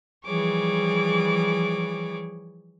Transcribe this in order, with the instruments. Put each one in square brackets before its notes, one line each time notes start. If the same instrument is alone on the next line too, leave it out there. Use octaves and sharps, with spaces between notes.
[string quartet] E3 F3 G3 G#4 C#5 D6